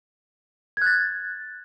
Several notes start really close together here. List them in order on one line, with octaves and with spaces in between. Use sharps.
G#6 F#6 A6